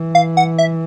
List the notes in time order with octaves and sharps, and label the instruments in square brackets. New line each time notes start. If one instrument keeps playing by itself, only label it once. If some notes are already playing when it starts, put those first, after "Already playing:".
Already playing: [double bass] E3
[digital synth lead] F5
F#5
E5